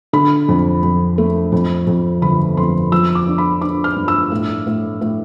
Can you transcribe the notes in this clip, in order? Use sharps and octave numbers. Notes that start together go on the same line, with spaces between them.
D3 B5
F2
F2
A3
F2
F2
G1 B5
F2 C6
F3 E6
D6
D4
B5
D4 D6
F6
G2
E6
A2
A2
A2